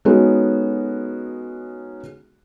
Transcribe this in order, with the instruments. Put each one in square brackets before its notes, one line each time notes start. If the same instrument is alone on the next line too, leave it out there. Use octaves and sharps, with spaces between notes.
[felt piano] G#3 B3 C#4 D#4 F#4 A4